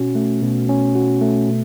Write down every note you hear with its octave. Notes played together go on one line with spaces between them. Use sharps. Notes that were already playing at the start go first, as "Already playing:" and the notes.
Already playing: B2 C#4 F#4
A3
B2
C#4
F#4
A3
B2